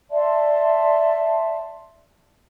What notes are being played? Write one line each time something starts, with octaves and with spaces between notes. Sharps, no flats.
D5 E5 A5 C6